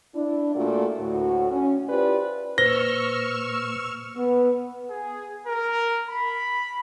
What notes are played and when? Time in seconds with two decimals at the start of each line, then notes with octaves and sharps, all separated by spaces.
0.15 D4 E4
0.55 A#2 A3 A#3 D4 F4 F#4
1.00 D2 A2 F#4
1.51 C#4
1.89 E4 F4 G4 B4 C5 D5
2.58 A#2 B4 C5 C#6 E6 F6 A#6 G7
4.17 B3
4.89 G#4
5.45 A#4
6.07 B5